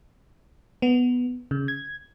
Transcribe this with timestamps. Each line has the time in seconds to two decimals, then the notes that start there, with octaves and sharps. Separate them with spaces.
0.82 B3
1.51 C#3
1.68 G#6